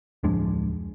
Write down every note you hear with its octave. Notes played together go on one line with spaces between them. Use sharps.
D1 F2 G#3 D4